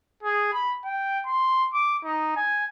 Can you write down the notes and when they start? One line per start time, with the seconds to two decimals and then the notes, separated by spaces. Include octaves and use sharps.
0.23 G#4
0.53 B5
0.85 G5
1.26 C6
1.74 D6
2.04 D#4
2.36 G#5